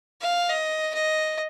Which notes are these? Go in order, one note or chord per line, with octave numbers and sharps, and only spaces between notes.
F5
D#5
D#5